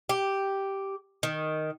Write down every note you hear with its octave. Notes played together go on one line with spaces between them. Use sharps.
G4
D#3